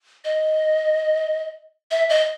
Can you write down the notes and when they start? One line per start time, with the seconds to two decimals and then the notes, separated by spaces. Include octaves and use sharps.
0.24 D#5
1.91 E5
2.09 D#5